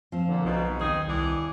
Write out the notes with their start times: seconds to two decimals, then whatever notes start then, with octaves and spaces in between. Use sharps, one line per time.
0.12 F3 C4
0.29 A#2 D3
0.45 B1 G#2 B2
0.79 D#2 D#3 C4 D#4 G#4
1.07 C2 E3 D4 G#4